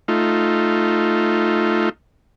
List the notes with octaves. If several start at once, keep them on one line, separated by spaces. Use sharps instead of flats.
A3 D#4 F4